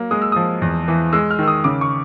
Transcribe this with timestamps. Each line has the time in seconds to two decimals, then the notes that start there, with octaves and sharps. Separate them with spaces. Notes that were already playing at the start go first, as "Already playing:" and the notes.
Already playing: F#3 A#3
0.11 G#3 D#6
0.22 E6
0.32 F3 D#6
0.62 E2
0.88 E3
1.13 G#3 E6
1.30 F6
1.39 D#3 E6
1.47 D#6
1.64 C#3 D6
1.81 C#6